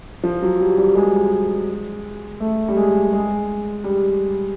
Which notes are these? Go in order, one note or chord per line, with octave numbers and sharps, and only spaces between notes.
F3
F#3
G3
G3
G#3
A3
G3
G#3
G#3
G3